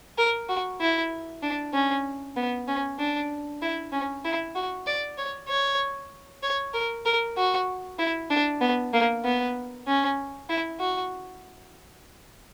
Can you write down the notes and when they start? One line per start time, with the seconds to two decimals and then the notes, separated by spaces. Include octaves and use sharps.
0.18 A#4
0.49 F#4
0.81 E4
1.43 D4
1.74 C#4
2.36 B3
2.68 C#4
2.99 D4
3.62 E4
3.93 C#4
4.25 E4
4.55 F#4
4.87 D5
5.18 C#5
5.48 C#5
6.43 C#5
6.74 A#4
7.06 A#4
7.37 F#4
7.99 E4
8.30 D4
8.61 B3
8.93 A#3
9.25 B3
9.87 C#4
10.50 E4
10.80 F#4